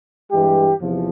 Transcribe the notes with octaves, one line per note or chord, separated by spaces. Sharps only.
G2 E3 G#3 G4
E2 C3 F3